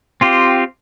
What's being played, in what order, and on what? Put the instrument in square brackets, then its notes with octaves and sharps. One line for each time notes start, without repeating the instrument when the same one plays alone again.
[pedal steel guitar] C4 F4 G4